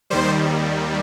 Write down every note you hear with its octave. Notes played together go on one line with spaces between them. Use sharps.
D#2 D#3 G3 C5